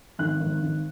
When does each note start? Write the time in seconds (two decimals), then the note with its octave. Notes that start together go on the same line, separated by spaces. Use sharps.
0.19 G#1 F#6
0.40 G#1
0.62 G#1